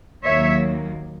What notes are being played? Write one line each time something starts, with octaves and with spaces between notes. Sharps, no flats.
D#2 D#3 F#3 A#3 C#5 E5